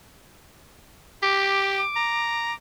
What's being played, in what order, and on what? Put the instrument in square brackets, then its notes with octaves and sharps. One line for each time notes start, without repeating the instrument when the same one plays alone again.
[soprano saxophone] G4 [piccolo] D6
[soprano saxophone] A#5